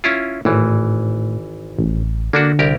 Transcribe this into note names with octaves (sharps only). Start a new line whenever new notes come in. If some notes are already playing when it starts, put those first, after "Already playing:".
C#4 E4 F4
G#1 A2 E3
A1
D3 A#3 D4 F#4
C2 G4 A#4